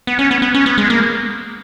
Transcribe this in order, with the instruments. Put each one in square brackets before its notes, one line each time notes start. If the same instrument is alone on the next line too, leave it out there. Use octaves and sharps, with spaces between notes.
[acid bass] B3
C#4
B3
B3
C#4
B3
G#3
A#3